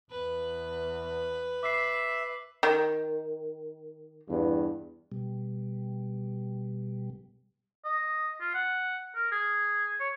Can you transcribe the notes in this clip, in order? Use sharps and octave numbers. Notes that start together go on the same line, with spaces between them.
E2 B4
E5 D6 C7
D#3
E2 G2
B2 G3
D#5
F4
F#5
A#4
G#4
C#5